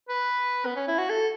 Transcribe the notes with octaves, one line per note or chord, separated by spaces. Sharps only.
B4
B3
C#4
E4
F#4
A4